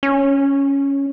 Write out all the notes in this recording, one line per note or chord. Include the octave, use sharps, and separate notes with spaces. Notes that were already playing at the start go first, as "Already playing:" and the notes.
C#4